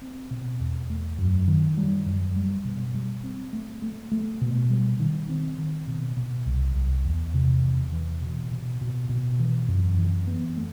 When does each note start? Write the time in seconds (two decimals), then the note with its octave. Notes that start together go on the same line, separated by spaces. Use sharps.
0.02 C4
0.31 B2
0.60 E2
0.90 A3
1.18 F#2
1.48 D#3
1.77 G3
2.06 F#2
2.36 G3
2.65 B2
2.94 G3
3.24 C4
3.53 A3
3.82 A3
4.12 A3
4.41 B2
4.70 G3
5.00 D#3
5.29 C4
5.58 D#3
5.87 B2
6.17 B2
6.46 C2
6.75 C2
7.05 E2
7.34 C3
7.63 E2
7.92 E3
8.22 B2
8.51 B2
8.81 B2
9.09 B2
9.40 E3
9.68 F#2
9.98 E3
10.27 B3
10.57 A3